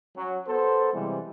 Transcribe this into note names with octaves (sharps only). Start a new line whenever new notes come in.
F#3 C#4
B3 A4 C5
C3 E3 G3 G#3